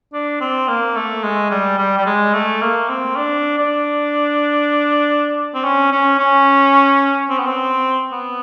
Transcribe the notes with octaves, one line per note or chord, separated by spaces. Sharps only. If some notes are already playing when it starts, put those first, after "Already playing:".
D4
C4
A#3
A3
G#3
G3
G3
G3
G#3
A3
A#3
C4
D4
D4
C4
C#4
C#4
C#4
C4
B3
C4
B3